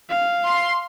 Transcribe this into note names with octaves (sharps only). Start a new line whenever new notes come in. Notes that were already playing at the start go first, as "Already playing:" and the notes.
F5
C6